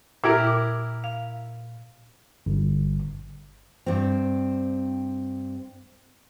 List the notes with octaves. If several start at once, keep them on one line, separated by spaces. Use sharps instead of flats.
A#2 E4 G4 A#4 F6 G#6
D6
F5
G1
G2 C4